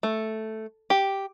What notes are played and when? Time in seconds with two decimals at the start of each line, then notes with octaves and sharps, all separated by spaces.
0.03 A3
0.90 G4